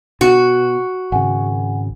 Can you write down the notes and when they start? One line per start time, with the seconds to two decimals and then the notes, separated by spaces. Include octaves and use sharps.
0.21 B2 F#4
1.12 G#1 C#3 F#5 G#5